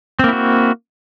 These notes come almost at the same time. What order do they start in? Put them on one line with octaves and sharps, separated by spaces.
C4 A#3 E4 F#4